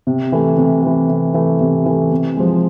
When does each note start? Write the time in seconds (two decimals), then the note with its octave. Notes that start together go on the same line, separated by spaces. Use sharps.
0.07 C3
0.32 E3 A3
0.58 C3
0.83 E3 A3
1.09 C3
1.34 E3 A3
1.60 C3
1.86 E3 A3
2.11 C3
2.36 F3 G#3